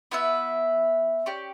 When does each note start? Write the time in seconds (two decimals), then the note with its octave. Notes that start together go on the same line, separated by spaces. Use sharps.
0.11 B3 E4 B4 E5
1.26 C#4 G4 D5